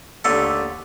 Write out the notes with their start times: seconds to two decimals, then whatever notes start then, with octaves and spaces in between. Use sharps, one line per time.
0.24 D#2 D3 A3 A4 C6